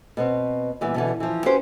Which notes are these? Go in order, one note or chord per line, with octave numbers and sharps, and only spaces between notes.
B2 B3 C4
A#2 E3 G3 B3
B2 D3 E3
E3 F3
C#4 F#4 G4 B4 C5